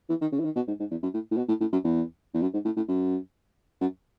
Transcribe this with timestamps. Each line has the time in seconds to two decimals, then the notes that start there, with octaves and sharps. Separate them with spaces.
0.09 E3
0.21 D#3
0.32 C#3
0.39 E3
0.45 D#3
0.56 B2
0.67 G#2
0.79 G#2
0.91 E2
1.03 F#2
1.14 A2
1.31 A2
1.37 B2
1.48 A2
1.60 A2
1.72 F#2
1.84 E2
2.34 E2
2.42 F#2
2.53 G#2
2.65 A2
2.76 A2
2.88 F#2
3.81 F#2